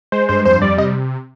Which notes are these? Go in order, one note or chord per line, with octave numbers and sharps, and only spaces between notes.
G#3 C5
G2 C5
F2 C5
G3 D5
C3 D#5